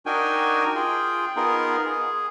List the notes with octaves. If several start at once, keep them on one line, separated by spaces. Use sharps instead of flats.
D4 D#4 F#4 A#4 G5 G#5
F4 G#4 G5
B3 D#4 F4 G#4 A#4
G#4